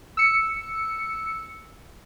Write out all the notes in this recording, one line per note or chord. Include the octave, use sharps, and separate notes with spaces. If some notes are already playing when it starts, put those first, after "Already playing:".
E6 C#7